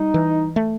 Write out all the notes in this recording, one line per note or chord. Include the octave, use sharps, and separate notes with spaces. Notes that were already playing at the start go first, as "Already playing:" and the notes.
Already playing: G3 D#4
E3
A3